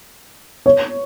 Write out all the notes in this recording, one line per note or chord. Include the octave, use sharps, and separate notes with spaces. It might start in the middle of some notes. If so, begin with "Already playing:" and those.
C#5